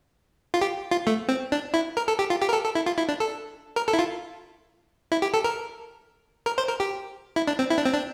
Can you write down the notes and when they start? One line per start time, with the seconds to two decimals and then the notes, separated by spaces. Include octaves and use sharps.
0.54 F4
0.62 G4
0.91 F4
1.07 A3
1.29 C4
1.52 D4
1.74 E4
1.97 A#4
2.08 A4
2.19 G4
2.30 F4
2.42 G4
2.49 A#4
2.53 A4
2.64 A4
2.75 E4
2.86 F4
2.98 E4
3.09 D4
3.20 A4
3.76 A#4
3.88 A4
3.93 E4
3.99 F4
5.12 E4
5.22 G4
5.34 A4
5.44 A#4
6.46 A#4
6.58 C5
6.68 A#4
6.80 G4
7.36 E4
7.48 D4
7.59 C4
7.70 E4
7.78 D4
7.85 C4
7.93 D4